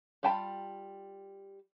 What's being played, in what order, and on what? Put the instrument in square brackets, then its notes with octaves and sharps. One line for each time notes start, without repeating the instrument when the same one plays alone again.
[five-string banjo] G3 F4 G5 A5 B5